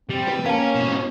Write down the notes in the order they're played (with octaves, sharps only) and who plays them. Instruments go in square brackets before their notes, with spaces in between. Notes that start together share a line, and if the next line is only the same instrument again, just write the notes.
[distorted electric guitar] G3 [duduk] C4
[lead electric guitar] B4
[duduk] A#3 [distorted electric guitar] C#4 [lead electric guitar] A#4 [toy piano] F5 G5 A5
[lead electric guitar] G#2 B2